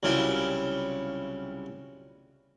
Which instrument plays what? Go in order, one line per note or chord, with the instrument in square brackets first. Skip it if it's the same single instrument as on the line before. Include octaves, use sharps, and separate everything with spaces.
[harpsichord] C2 C#3 F#3 E4 F4 G4